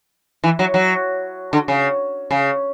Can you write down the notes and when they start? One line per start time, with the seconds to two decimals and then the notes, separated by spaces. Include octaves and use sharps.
0.44 E3
0.59 F#3
0.74 F#3
1.53 D3
1.68 C#3
2.31 C#3